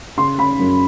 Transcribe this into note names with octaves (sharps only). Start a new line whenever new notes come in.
C#3 C6
C#3 B5
F#2